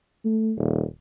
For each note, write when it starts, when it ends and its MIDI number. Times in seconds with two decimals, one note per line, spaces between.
0.25 0.52 57
0.57 0.83 27